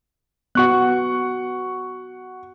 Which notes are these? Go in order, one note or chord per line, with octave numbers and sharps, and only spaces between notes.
B3 F#4 F#5 C#6 F#6